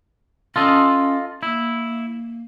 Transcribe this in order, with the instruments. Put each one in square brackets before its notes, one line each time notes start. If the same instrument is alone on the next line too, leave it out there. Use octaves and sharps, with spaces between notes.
[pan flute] C#4 [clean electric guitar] F4 A4 D#5
[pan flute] A#3 [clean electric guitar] E4